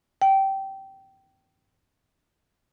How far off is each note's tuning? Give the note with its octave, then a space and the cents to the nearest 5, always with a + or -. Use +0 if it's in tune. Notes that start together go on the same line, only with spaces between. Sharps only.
G5 -15